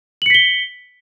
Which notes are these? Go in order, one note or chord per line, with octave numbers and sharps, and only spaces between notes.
B6 C#7 F#7 G7